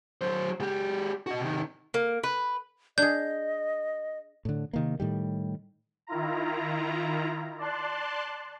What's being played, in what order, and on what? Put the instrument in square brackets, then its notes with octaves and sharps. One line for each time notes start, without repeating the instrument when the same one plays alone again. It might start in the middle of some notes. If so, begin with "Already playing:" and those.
[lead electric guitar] F#3 C5
G#3 G4
F#4 D#5
C3 D#3
[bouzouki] A#3
B4
[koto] D4 G#4 [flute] D#5 [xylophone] G6
[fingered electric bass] A2 D3
C3 D#3 A#3
A2 D#3 G3
[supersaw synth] D#3 E4 F4 A#5
D5 A5 C6 F#6